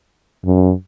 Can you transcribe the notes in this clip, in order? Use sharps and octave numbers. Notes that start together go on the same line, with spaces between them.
F#2